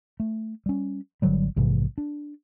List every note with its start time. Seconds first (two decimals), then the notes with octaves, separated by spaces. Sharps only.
0.20 A3
0.66 G3 C#4
1.22 G#1 D3 F#3 G3
1.56 A#1 G#2 C3 E3
1.98 D4